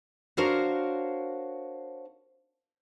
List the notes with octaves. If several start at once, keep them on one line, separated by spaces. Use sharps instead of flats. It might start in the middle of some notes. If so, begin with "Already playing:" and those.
D4 F#4 A#4 C5 C#5 F5